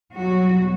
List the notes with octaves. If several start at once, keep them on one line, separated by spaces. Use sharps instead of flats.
E2 B2 F#3 G3 F#4